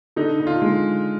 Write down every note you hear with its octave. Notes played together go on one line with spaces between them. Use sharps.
D3 D#4
D3
F4
G#3